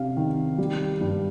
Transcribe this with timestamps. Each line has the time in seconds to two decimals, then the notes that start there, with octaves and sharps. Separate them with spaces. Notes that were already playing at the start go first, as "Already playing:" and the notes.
Already playing: C3 D4 F5
0.17 D#3
0.58 G3
1.01 G2